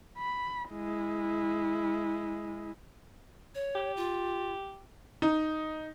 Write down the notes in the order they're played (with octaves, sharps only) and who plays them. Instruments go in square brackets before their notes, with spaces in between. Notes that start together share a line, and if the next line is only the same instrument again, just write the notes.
[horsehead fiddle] B5
G#3 E4
[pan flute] C#5
[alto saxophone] G4
[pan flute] F4
[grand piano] D#4